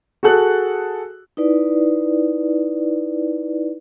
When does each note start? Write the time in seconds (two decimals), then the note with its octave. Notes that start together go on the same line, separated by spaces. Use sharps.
0.23 F#4 G#4 A4 F#6
1.37 D#4 E4 B4 D5